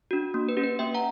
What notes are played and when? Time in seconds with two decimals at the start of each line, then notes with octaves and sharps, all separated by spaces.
0.11 D4 F#4
0.34 A#3
0.49 B4
0.57 C#4 G4
0.64 B4
0.79 A#3 E5 G5
0.94 F#5 A#5